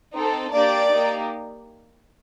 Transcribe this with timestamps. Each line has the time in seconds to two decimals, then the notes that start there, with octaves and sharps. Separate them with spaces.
0.16 C4 D#4 A4
0.53 A#3 D4 G4 D5
0.91 A#3 D#4 G4